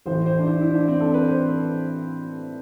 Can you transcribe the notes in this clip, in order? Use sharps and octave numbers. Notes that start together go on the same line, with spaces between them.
A1 A2 E3 C5
C5
D4
E4
E4
D4
C4
A4
B4
C5